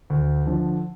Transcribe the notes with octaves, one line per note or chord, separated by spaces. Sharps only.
D2
D3 F3